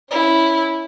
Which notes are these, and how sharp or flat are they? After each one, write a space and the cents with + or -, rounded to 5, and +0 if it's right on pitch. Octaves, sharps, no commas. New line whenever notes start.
C#4 +5 E4 -5